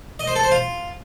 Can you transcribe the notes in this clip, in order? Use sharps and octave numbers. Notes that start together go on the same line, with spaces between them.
D#5
C5
A4
C5
F4